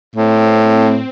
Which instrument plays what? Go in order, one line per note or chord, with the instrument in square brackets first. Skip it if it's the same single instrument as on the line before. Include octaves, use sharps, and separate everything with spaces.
[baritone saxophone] A2 [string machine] C4